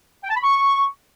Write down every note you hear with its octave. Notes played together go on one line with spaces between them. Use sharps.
G5
A5
B5
C#6